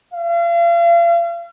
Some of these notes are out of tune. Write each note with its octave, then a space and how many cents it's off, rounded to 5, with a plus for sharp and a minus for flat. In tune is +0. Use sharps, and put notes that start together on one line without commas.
F5 -40